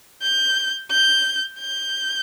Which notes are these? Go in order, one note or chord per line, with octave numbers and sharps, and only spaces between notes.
G6
G6
G6